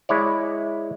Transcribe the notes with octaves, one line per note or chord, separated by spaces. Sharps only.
G#3 E4 C#5 D5